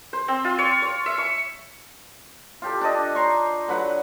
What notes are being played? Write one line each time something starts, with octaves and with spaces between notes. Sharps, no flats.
C5
C4
F4
C#5
C#5
E5
C#6
F4 G4 A4
D4 A4 D#5
A#5 C6 C#6
D3 F#3 B4 F#5